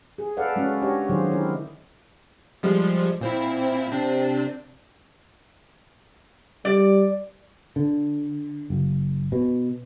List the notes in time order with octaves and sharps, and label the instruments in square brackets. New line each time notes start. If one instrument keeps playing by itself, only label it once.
[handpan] G#4
A4 B4 D5 F5 F#5
G#3 C#4 F#4
D4 G4 C#5 D#5
D3 D#3 F#3 F4 G#4 C5
C4 E4 A#4
[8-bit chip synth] F3 G3 G#3
A#2 C4 E4
C3 C4 D4
[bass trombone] G3 [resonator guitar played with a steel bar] D5
[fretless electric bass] D3
F#1
B2